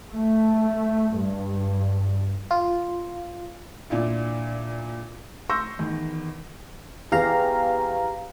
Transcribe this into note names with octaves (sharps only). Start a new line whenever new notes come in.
A3
G2
F4
A#2 D4 E4 F4
C6 C#6 E6 G6 A#6
E2 D#3
E2 G4 F5 A#5